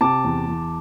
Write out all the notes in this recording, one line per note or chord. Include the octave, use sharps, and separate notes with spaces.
C3 A5 D6
E2
E2